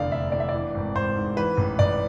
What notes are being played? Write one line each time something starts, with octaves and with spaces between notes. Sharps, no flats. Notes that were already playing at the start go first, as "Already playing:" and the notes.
Already playing: F1 E2 D3 D5 F5
F1 E5
E2 D5
E5
D5
E3
G#1
G#1 C5
G#2
E3 B4
A1
A1 D5